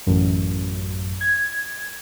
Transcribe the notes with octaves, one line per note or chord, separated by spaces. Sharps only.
A1 F#2
G#6